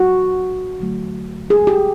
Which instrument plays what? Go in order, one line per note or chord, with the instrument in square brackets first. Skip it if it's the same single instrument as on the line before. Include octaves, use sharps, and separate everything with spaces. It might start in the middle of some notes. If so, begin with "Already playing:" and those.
Already playing: [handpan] F#4
D3 F#3 A3
G#4
G4